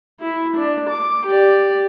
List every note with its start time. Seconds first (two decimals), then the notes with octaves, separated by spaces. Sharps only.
0.21 E4
0.56 D4
0.89 D6
1.26 G4 D5